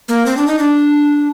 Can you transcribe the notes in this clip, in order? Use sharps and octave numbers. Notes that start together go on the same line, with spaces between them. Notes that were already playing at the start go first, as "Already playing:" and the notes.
A#3
C4
D4
D#4
D4